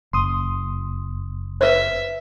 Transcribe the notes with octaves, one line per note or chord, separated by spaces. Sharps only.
F#1 C6 D#6
B4 C5 E5